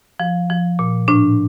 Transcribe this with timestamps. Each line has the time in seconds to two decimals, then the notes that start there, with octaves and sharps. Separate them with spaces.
0.20 F3
0.50 F3
0.79 A#2
1.08 A2 D4